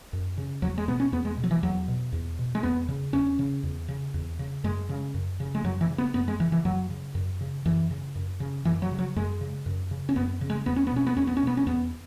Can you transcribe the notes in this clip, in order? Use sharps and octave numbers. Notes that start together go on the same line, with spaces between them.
F#2
C#3
E2 F#3
G#3
B2 B3
C#4
E2 B3
G#3
B2
F#3
E3
E2 F#3
B2
E2
B2
G#3
E2 B3
C#3
E2 C#4
C#3
E2
C#3
E2
C#3
F#2 G#3
C#3
F#2
C#3
G#3
F#2 F#3
E3
C#3
B3
F#2 B3
G#3
C#3 E3
E3
F#2 F#3
C#3
F#2
C#3
F#2 E3
C#3
F#2
C#3
F#2 E3
F#3
C#3
F#3
F#2 G#3
C#3
F#2
C#3
C#4
F#2 B3
C#3
G#3
E2 B3
C#4
B3
B2 C#4
B3
E2 C#4
B3
C#4
B2 B3
C#4
E2 B3